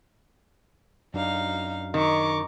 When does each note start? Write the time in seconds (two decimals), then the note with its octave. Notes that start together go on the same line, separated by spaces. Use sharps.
1.14 F#2 D4 D#4 F5
1.94 D#3 A#5 C#6 D6